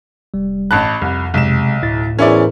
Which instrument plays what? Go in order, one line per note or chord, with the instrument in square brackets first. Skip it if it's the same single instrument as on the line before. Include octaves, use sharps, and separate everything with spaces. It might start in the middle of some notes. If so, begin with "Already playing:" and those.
[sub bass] F1 [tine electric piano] G3
[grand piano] A1 A5 F#6 [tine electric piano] B5
[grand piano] C2 [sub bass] F2
[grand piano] B1 E7 [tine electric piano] C3 G#3
[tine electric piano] D2 E4 A6 [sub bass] A2
[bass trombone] E2 [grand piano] C#4 E4 D5 [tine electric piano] A#4 C5